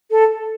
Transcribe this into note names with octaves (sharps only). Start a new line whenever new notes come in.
A4